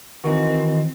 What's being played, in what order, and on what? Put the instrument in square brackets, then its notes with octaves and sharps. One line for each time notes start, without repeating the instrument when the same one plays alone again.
[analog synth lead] D#3 [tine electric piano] E3 F#4 [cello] C4